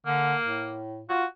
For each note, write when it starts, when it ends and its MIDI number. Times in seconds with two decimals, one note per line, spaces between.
0.06 0.35 50
0.06 0.77 58
0.43 1.04 45
1.09 1.25 65
1.09 1.24 66